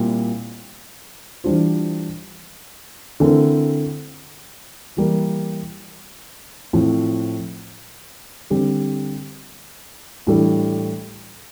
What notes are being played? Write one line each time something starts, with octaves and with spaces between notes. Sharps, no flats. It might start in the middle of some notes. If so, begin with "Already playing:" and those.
Already playing: A#2 G3 C4 E4
E3 G3 D4 F4 C5
D3 A3 C4 E4 A#4
E3 G3 A#3 E4
A2 F3 C4
D3 G3 C4 G4
A2 E3 G3 D4 A4